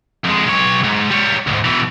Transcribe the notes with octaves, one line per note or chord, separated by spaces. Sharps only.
F2 G#3
B1 C#5
G#2
G3 C#5
D2 G#2
B2 E3